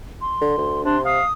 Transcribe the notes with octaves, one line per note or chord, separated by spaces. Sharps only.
C6
D3
D2
C3 D4 C6
F5 D#6